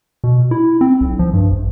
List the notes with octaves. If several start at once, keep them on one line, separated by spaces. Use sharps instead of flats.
B2
E4
C4
B1
F3
G2
A#1